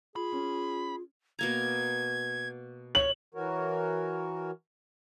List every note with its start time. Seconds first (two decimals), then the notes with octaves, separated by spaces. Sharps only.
0.16 F4 G#4 B5
0.32 C#4
1.39 B2 A#3 A#5 G#6
2.95 C#5 F#7
3.35 E3 F#4 A#4 C#5